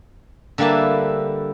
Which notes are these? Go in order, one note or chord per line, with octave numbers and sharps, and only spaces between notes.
D3 G3 A#3 E4 B4 A5